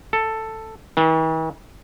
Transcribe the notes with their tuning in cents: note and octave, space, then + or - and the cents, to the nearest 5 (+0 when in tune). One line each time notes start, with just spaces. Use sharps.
A4 +5
E3 -45